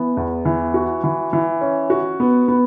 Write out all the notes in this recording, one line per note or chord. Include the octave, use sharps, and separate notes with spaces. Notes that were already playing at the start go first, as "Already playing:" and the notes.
Already playing: E3 B3
E2
E3
F#4
E3
E3
C#4
F#4
B3
B3